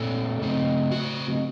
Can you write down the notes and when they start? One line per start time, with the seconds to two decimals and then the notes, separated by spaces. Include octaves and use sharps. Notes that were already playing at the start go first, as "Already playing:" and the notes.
Already playing: A#2 A3 C4 A4
0.42 C#3 A3 C4
0.92 F#4